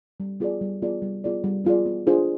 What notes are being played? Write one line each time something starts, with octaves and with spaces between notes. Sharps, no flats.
G3
B3 F4 G#4 D5
G3
B3 F4 G#4 D5
G3
B3 F4 G#4 D5
G3
B3 F4 G#4 D5
B3
D4 F4 G#4 C5